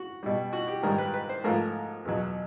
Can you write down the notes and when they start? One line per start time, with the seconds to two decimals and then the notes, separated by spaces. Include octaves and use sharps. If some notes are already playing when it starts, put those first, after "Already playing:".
Already playing: F#4
0.23 B2 G3
0.53 F#4
0.68 G4
0.83 G#2 D#3 G3 A#4
0.98 B4
1.14 B4
1.29 C5
1.44 G#2 F3 A3 A#4
2.05 E2 B2 F#3